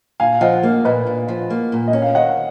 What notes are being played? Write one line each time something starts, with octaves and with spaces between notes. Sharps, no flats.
A#2 F5 G#5
F3 D#5 F#5
A#3
A#2 B4 D#5
A#2
F3
A#3
A#2
D#5
C#4
F5
D#3 D#5 F#5